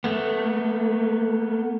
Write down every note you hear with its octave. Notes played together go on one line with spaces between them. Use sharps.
A3 B3